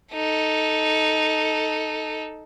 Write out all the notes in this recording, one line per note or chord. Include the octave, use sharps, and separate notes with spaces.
D#4 A4